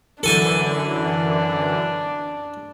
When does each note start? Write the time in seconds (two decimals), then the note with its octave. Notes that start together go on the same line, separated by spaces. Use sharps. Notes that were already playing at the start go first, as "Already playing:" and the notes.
0.23 F#2 D3 E3 D4 A4 G#5 A5